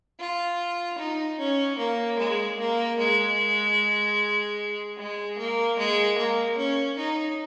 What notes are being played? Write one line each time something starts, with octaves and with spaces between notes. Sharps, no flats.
F4
D#4
C#4
A#3
G#3
A#3
G#3
G#3
A#3
G#3
A#3
C#4
D#4